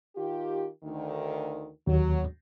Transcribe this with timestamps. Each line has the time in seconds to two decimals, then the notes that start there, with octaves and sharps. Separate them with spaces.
0.16 D#3 F4 G4
0.84 D2 D#3
1.87 D#2 F#3